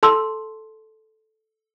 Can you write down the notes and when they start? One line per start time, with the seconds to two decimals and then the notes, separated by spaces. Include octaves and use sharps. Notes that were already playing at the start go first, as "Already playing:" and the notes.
0.03 A4 A5 C6 E6